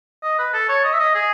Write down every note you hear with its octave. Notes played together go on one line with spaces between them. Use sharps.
D#5
B4
A4
C#5
D#5
E5
D#5
G#4